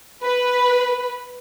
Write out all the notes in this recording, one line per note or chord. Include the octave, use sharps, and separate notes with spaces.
B4